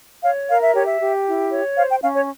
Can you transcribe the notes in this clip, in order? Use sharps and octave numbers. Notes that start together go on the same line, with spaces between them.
C#5 F5
A#4 F5
E5
G4 C#5
E5
G4
E4
C#5
C5 F5
G5
C#4 F5
C#5